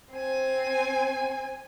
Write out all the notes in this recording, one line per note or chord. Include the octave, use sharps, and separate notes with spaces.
C4 G#5